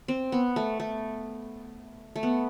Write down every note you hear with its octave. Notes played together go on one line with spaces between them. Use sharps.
C4
B3
A3
A3
A3
B3